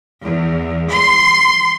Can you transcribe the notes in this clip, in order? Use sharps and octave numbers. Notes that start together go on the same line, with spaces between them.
E2
C6